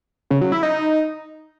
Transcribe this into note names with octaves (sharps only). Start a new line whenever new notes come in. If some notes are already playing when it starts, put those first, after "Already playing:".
C#3
F#3
E4
D#4